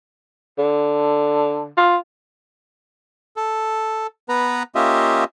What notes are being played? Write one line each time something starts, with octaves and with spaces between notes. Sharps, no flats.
D3
F4
A4
B3 B4 A#5
A#3 C#4 F4 G4 D#5 E5